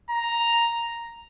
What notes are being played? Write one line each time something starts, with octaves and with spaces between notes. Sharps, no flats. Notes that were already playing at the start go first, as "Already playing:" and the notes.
A#5